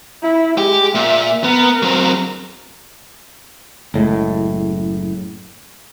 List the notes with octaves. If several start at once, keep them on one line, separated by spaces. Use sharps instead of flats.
E4
G#3 G4
A#2 E5
B3 A#4
F#3 C4
F#1 A2 G#3